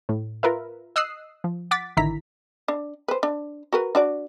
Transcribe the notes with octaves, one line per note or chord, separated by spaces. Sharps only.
A2
F4 A#4 B4 E5
D#5 D#6 E6 F#6 C7
F3
F#5 D6 A6 B6
A1 D3 D#3 E4 A#5 B6
D4
B4 C5
D4
F#4 A#4 B4
D4 F#4 D5